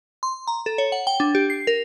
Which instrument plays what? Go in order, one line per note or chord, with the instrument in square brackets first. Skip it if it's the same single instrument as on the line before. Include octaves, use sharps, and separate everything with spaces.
[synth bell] C6
A#5
A4
C#5
F#5
G5
D4
G4
C7
A#4